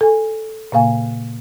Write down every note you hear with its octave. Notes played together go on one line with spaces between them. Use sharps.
A4 G#5
A#2 C#3 A#3 F5 G#5